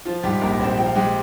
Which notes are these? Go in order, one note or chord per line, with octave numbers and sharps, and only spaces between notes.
F3 F4
G#2 G3 G4
A#1 A#3 A#4
A#1 C4 C5
F3 G5
F5
G#3 G4 G5